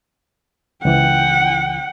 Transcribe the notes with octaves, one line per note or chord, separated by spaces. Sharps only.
C#2 E3 F#5 G5